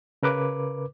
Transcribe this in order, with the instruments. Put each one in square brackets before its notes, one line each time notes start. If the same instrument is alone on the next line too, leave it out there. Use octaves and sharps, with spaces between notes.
[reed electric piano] C#3 A#4 B4 D6